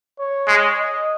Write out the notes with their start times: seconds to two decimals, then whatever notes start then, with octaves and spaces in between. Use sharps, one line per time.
0.19 C#5
0.48 G#3
0.77 D#5